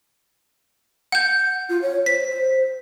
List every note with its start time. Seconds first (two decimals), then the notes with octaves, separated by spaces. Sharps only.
1.12 F#5 G6
1.69 F4
1.82 C#5
2.06 C5 B6
2.26 C5